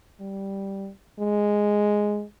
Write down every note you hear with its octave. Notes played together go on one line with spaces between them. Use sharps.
G3
G#3